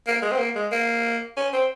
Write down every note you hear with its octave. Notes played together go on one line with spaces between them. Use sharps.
A#3
G#3
C4
A#3
G#3
A#3
C#4
C4